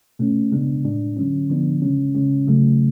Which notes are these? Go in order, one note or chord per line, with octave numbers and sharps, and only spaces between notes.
B2 A3 C#4
C#3 G#3 B3 D4
A2 G#3 D4
D3 F#3 C#4
D3 F3 B3 D4
C#3 G#3 C#4
C#3 G#3 C#4
C#3 F#3 A3